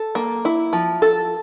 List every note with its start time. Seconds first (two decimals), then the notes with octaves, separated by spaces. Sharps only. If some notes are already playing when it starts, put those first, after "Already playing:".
Already playing: A4
0.15 A#3
0.45 E4
0.73 F3
1.02 A4